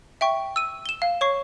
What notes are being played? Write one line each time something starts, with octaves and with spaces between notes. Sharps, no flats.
E5 G5 C#6
E6 D#7
E7 G7
F5
C#5 C#6 C7